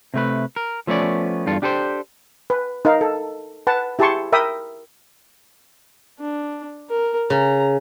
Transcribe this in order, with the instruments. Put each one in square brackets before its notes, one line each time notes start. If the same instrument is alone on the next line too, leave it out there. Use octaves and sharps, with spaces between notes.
[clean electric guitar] C3 A3 B4
A#4
F3 A3 B3 C#4 D5
E2 G2 F4 A4
D4 G4 A4 B4 C5
[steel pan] B4
D#4 A#4 F5
A4
B4 F#5 A5
E4 G4 G#4 A5 C6 C#6
A#4 E5 G5 B5 D#6
[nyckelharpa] D4
A#4
[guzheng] C#3 [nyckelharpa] A#5